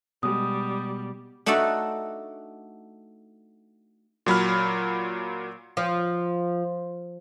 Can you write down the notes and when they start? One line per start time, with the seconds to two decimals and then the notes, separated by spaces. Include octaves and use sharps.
0.23 B2 G3 G#3 D#6
1.46 A3 D4 D#4 F#4 A4 D5
4.26 A#2 F#3 B5 F6
5.77 F3